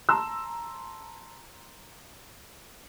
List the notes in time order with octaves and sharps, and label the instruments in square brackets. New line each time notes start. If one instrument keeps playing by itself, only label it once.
[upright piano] A5 A#5 C6 E6